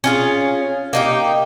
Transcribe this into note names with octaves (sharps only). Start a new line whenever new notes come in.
C#4 F4 G#4
A#3 D#4 G4